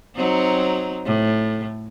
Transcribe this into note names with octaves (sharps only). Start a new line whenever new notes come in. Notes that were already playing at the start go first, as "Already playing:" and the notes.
F#3 C4 D#4
A2